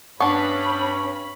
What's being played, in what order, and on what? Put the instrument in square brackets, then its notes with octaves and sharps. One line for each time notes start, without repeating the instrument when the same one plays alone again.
[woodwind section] G2 [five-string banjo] B3 D4 [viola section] C#4 B5 [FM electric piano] C#6